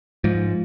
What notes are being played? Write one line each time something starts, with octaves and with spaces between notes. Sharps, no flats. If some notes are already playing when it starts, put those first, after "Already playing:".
G#2 F3